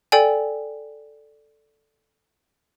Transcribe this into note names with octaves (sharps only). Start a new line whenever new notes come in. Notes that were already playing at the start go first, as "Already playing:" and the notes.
A4 D5 G5 G#5